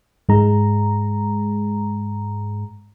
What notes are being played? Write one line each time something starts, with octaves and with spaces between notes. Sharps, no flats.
G#2 G#3 A#5